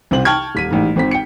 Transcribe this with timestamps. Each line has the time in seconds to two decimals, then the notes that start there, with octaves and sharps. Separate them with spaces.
0.11 C2 C3 C5 F#7
0.25 G5 A5 C#6 F6 G#6
0.55 D#1 B6 D#7
0.71 A1 G#2
0.96 G#1 C4 B6
1.11 G5 C#7